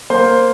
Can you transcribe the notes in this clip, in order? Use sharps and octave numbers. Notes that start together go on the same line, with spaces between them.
A#3 C5